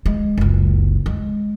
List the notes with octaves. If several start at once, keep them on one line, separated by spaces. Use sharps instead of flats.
G#3
F#1 C#2
G#3